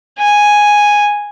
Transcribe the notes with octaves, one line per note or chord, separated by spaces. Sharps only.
G#5